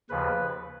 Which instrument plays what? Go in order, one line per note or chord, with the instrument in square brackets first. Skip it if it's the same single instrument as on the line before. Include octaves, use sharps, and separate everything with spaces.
[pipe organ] D#2 C#3 F3 B4